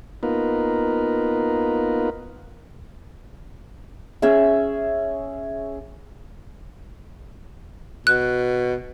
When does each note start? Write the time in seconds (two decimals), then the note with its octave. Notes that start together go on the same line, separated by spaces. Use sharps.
0.23 A#3 B3 D#4 F4 A#4 B4
4.22 C#4 G#4 E5
8.07 B2 F#6